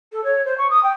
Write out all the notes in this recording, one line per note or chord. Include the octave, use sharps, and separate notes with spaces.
A4
C#5
C5
C#6
D#6
G5